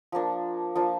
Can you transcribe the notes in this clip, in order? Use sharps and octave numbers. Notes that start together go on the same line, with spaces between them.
F3 A#3 D4
F3 A#3 D4